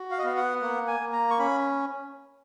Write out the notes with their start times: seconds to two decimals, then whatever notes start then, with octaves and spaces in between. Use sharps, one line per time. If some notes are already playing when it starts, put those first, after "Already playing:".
Already playing: F#4
0.11 F5
0.19 D#5
0.24 B3 F5
0.37 F#5
0.62 A#3 F#5
0.87 G#5
1.00 A#3
1.13 A#5
1.30 C#6
1.39 C#4 B5